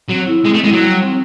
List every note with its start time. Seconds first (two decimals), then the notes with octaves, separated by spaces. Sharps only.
0.09 F#3 C4
0.27 E4 A4
0.45 G#3 C4
0.54 A3
0.64 G#3 E4 A4
0.73 F#3
0.83 G3
1.01 C4 D#4